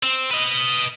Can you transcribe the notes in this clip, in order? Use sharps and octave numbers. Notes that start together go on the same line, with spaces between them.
C4
B4 D#5